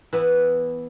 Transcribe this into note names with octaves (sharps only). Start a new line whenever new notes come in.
E3 B3 E4